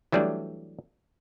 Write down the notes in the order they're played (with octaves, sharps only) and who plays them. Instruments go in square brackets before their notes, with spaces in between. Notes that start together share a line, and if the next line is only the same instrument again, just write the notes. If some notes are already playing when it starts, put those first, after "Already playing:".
[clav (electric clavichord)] E3 F#3 G3 A3 D4